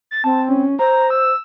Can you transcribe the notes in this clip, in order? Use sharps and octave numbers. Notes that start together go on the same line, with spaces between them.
A6
C4 A5
C#4
C5 A#5
E6